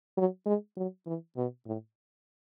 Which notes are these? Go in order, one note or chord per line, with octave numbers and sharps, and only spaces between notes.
F#3
G#3
F#3
E3
B2
A2